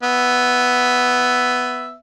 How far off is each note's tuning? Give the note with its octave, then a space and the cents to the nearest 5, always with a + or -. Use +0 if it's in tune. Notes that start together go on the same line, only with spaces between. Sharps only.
B3 +5 E5 +0